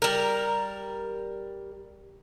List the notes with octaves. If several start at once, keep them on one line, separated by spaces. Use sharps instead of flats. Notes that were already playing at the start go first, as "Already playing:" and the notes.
G3 A#4